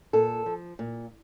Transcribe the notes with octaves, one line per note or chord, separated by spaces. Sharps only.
A#2 A4
F3
A#2